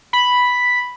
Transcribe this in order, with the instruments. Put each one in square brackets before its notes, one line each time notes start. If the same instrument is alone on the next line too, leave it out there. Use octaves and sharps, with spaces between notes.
[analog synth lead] B5